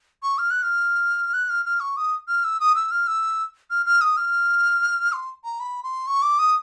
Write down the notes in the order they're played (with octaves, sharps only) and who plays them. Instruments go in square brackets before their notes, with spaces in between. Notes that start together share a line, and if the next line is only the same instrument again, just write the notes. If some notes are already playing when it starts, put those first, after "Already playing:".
[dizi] C#6
F6
F#6
F6
F#6
F6
F6
C#6
D#6
F6
E6
D#6
E6
F6
E6
F6
F6
D#6
F6
C6
A#5
B5
C6
C#6
D6
D#6